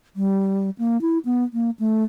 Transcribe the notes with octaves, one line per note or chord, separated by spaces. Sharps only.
G3
A#3
E4
B3
A#3
A3